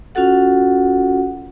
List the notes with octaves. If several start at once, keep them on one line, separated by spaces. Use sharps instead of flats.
C#4 F4 F#4 A4 F#5